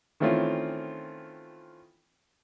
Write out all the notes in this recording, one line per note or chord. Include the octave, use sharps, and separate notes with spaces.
D#3 E3 A3 C4 C#4 F4